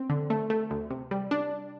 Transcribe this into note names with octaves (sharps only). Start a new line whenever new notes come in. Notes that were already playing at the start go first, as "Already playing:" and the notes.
Already playing: C4
D3
A3
A3
D2
C3
G3
D4